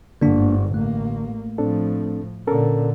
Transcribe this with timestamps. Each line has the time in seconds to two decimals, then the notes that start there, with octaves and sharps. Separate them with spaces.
0.22 G1 G#2 D3 A#3 D4
0.74 A1 A3 A#3
1.58 A2 F3 C4 D4 A4
2.47 A#2 D3 C#4 A4 A#4